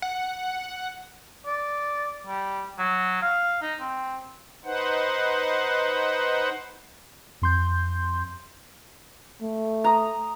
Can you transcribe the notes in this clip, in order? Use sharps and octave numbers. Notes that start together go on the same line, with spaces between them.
F#5
D5
G3
F#3
F5
D#4
C4
D#4 B4 C5 F#5
F2 C6 G6
A3
A#5 D#6